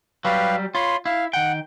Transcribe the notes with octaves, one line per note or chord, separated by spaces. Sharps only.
F#3 G3 G4 B4 F5
F4 C#5 B5 C6
E4 F5
D#3 F#5 G5